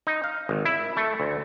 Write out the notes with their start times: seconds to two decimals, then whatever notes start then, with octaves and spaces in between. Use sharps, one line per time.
0.07 D#4
0.24 F5
0.49 G#1
0.65 E4
0.97 A3
1.20 D2